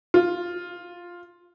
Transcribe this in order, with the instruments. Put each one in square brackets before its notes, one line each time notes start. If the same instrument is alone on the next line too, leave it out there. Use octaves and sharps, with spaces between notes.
[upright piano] F4